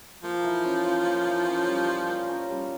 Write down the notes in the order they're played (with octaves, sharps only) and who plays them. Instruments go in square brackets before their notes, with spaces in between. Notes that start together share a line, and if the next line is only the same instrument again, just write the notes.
[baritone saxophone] F3 [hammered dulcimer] A#3
[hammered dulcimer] E3
C#4
F4
A#3
E3
C#4
G3
F4
A#4
C#4
G3